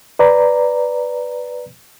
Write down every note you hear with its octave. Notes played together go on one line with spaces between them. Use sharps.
B4 D5 A#5